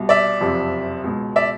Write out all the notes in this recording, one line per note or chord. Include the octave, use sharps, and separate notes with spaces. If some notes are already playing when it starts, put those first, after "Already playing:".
Already playing: C2 B2
D5 E5
F#1 F2 C3 F3
C#2 B2
D5 E5